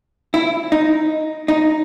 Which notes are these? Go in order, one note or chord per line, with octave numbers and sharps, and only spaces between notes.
E4
D#4
D#4